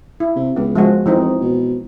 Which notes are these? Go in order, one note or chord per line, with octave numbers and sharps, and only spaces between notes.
E4
C3
C#2 B3
F3 G#3 F#4
F2 E3 C4 D#4
B2